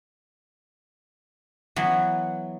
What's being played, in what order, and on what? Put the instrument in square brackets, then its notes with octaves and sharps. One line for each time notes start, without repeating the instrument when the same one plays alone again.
[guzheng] E3 F#3 B3